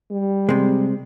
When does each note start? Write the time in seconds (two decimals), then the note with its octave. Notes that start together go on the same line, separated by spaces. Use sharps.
0.11 G3
0.49 C3 G#3